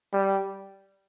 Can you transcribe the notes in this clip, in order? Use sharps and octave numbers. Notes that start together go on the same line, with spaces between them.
G3